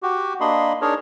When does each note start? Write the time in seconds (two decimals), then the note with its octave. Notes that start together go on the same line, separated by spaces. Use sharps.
0.03 F#4 G4
0.41 A#3 D4 D#5 B5 C6
0.81 D4 D#4 G#4 A#4 C#5